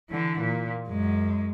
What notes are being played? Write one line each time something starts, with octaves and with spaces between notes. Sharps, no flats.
D3 E3
A#2
F#2 G#3